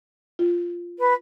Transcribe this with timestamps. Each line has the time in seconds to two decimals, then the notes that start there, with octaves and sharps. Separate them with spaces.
0.39 F4
0.98 B4